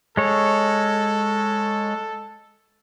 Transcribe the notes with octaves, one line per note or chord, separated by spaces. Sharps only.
G#3 A4 C#5